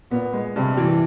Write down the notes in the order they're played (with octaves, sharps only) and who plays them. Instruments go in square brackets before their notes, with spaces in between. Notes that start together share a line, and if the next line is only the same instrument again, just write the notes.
[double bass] A#2 [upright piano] B3
[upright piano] G#3
[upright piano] G2 [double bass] C3
[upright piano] E3